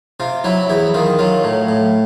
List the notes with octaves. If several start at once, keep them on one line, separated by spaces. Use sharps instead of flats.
C3 F4
F#3 E4
E2 E4
D#3 F4
F#3 F4
A2
A2